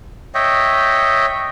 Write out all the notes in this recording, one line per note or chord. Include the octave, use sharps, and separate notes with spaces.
C#5 D#5 E5 G5